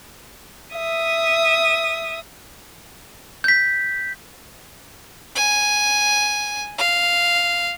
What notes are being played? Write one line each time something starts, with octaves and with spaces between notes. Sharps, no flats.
E5 D#6
G6 B6
G#5
F5